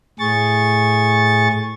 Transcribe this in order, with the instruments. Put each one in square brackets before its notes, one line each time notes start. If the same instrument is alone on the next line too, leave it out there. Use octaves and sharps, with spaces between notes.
[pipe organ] A2 G#4 C#6 A6